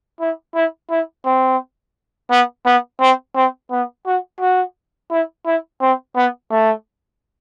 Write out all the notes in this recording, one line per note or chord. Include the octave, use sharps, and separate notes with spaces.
E4
E4
E4
C4
B3
B3
C4
C4
B3
F#4
F#4
E4
E4
C4
B3
A3